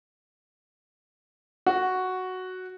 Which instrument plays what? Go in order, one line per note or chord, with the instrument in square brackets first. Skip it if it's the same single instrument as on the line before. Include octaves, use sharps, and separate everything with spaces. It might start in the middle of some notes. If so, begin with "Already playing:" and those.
[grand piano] F#4